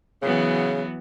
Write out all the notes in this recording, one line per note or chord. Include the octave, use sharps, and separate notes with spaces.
C#3 E3 F#3 B3